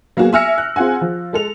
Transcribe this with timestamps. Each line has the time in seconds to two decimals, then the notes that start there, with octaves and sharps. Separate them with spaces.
0.17 F#3 A#3 B3 F#4 G#4
0.33 E5 G#5 E6 F6 A#6 C#7
0.58 F#6
0.76 C4 F4 G#4 F#5 G#5
1.01 F3
1.33 G#3 A4 F7